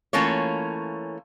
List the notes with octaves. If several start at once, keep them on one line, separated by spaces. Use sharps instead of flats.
E3 A3 A#3 C#4 F4 C#5